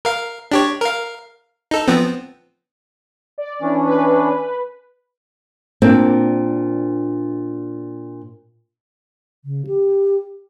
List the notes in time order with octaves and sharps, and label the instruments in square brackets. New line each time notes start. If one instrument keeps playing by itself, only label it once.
[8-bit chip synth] A#4 F5
D4 G4 C#5
A#4 F5
D#4 A4
F3 B3 C4
[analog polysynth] D5
[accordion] E3 C#4 D4
[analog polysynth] B4
[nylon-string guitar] A#2 C4 D4
[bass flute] C#3
G4